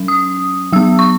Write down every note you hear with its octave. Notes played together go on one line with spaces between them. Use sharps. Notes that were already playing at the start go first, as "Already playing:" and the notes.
Already playing: F#3 C#4
D#6
F#3 B3 E6
C#6